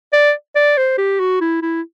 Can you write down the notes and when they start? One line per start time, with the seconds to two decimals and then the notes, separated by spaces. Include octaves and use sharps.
0.13 D5
0.55 D5
0.77 C5
0.98 G4
1.20 F#4
1.41 E4
1.62 E4